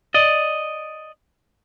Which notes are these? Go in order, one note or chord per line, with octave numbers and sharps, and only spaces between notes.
D5 D#5